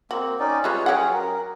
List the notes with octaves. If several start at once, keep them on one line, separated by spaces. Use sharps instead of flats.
A#3 C4 F#4
C#4 D#4 D5
G3 G#3 F4 B4 C#5
F#3 C#4 G4 G#4 F#5
A#4